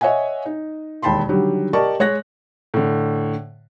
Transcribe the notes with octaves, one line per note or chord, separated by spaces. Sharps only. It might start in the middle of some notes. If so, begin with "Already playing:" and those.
C#5 D#5 E5 F#5 G#5
D#4
E1 D#2 G5 A5 B5 C6
D3 D#3 F#3 G3 G4
G4 A#4 D5 D#5 A5 C#6
G#3 C#5 F#6 A#6
A2 D3